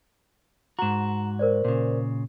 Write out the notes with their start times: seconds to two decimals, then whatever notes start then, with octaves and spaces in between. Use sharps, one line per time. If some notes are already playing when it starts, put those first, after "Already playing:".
0.79 G#2 F#4 A#5 E7
1.39 A#4 C5 D5
1.65 A#2 C#3